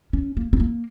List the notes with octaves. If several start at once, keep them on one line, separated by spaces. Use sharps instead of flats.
C#4
A#3
C4
A#3